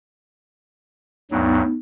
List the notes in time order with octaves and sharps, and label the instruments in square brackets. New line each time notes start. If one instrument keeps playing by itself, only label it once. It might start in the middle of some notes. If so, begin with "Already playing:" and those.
[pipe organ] D2 G2 F#3 [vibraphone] B3 D#4